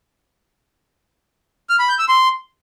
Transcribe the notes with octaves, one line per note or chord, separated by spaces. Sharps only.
F6
B5
G6
E6
C6